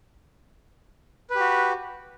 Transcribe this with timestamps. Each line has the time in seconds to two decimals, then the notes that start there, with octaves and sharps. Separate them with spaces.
1.30 B4
1.35 G4
1.40 F#4